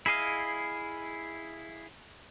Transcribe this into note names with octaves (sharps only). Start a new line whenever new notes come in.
E4 G#4 D#5 F5